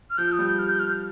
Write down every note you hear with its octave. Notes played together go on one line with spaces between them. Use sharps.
F6
F3 G6
D#6
G3
G6
F6
G6
F6
F6